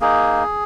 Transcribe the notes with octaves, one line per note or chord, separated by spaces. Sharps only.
A#3 D#4 G#4